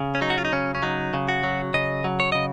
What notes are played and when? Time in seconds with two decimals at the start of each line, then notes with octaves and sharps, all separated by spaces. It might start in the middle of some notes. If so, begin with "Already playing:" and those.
Already playing: C#3
0.15 C#4
0.21 F#3 D#4
0.30 F#4
0.38 F4
0.45 D#4
0.52 C#3 C#4
0.75 C#4
0.83 F#3 D#4
1.14 C#3
1.28 F#4
1.44 F#3
1.74 C#3 D#5
2.04 F#3
2.20 C#5
2.32 C#3 D#5